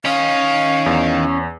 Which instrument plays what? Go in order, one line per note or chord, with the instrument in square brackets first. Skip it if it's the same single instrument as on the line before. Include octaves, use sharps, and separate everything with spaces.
[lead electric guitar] D#3 D#5 [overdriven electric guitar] C#4 [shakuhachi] F5
[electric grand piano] E2